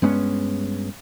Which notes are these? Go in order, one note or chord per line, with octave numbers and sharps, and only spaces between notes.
G2 G#3 B3 C#4